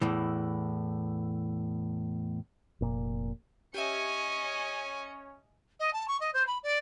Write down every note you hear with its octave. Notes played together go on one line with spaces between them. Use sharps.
E2 A2 E3
F1 A#2
C#4 G4 D#5 E5 G#5 C#7
D#5
A5
C#6
D#5
C5
B5
D5